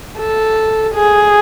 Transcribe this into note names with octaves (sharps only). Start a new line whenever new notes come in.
A4
G#4